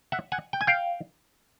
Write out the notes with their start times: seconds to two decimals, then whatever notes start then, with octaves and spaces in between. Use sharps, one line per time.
0.12 E5 F#5
0.32 F#5 G#5
0.53 G5
0.61 G#5
0.67 F5 G5